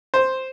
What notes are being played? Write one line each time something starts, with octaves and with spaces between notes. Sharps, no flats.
C5